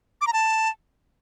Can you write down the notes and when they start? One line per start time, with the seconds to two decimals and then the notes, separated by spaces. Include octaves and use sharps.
0.21 D6
0.27 A#5
0.33 A5